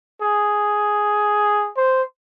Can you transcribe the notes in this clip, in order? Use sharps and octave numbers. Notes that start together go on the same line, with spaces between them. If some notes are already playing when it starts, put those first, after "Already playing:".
G#4
C5